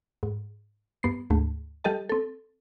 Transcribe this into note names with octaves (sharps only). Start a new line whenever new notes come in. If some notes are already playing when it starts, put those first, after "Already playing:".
G#2
G2 B3 C7
D2 G#2 A3
G3 G4 A4 D#5 A5
C4 A4